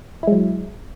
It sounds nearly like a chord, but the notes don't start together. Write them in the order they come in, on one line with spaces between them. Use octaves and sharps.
E4 G#3 F#3